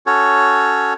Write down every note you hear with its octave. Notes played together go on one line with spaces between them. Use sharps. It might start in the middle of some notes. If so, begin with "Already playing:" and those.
C#4 F#4 A4 C#5